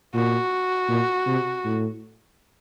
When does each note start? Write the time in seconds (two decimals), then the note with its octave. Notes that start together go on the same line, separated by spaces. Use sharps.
0.14 A#2 F#4
0.89 A#2
1.27 C3
1.64 A2